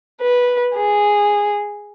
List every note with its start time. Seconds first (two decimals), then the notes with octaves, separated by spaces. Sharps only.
0.22 B4
0.75 G#4